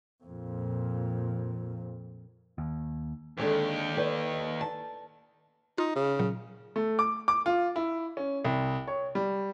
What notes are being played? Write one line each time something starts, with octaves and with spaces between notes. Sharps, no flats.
F2 A#2
D#2
D#2 D3 G#3 C4 G4
B4 D5 G5
A5
D#4 F4
C#3
A#2 F#3
A3
D6
D6
F4
E4
C#4
C2
C#5
G3